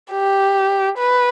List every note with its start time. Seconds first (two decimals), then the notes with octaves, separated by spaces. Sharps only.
0.11 G4
0.98 B4